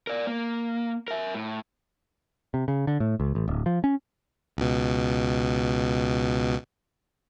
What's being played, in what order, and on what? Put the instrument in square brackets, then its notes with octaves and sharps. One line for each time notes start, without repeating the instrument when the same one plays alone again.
[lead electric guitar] A#4 D5
A#3
A#4 E5
A2
[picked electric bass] C3
C#3
D3
A2
C#2
A1
D1
F3
C#4
[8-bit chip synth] C#2 B2